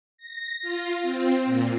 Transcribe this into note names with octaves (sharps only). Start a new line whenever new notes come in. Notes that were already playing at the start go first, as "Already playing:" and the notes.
A#6
F4
C4
A#2